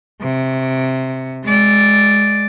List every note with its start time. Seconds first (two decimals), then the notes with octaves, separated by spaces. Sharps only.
0.21 C3
1.43 G#3 D5